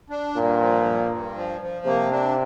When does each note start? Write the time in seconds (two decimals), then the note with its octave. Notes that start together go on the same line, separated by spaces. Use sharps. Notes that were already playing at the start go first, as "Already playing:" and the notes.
0.10 D4
0.36 G2 A#2
0.61 F3
0.85 G2
1.10 G2
1.35 F3
1.61 F3
1.86 C3 A#3
2.11 D4